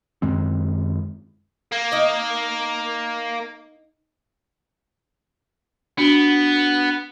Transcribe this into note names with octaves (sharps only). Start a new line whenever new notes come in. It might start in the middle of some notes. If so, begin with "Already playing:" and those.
F#2 D#3 G#3 C4
A#3
D#4 D#5
B3 D4 F#4 D7